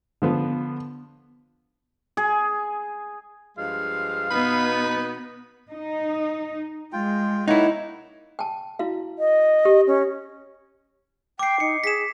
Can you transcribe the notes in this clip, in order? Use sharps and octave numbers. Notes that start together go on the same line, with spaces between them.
D3 F3 B3
G#4
G2 F3 G#3 F5
B2 B3 D#4 B5
D#4
G#3 F4 G5
A#3 D#4 E4 C#5 F#5
G5 A5
E4 F#4 F5
D#5
G4
C#4
G5 D6 C7
D#4 C#7
G#4 B6 E7